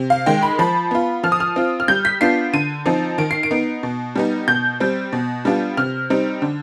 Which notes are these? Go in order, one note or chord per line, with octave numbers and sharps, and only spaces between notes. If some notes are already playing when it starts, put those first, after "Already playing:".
Already playing: C3
F5
D#3 G#3 G5
B5
F3 B5
B3 F4
F3 F6
D#6
F6
C4 F4
F6
G3 G6
B6
B3 D4 F4 C7
D3 D#7
F3 C4 D#4
D#3 D7
C7
D7
B3 D#4
B2
G3 B3 D#4
B2 G6
G3 C4
B2
G3 B3 D4 F4
C3 F6
G3 C4 D#4
D3